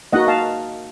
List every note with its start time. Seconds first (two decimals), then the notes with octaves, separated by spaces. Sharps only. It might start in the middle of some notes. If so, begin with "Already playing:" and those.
0.13 A#3 D#4 F#4 D#5 F#5
0.28 F5 A5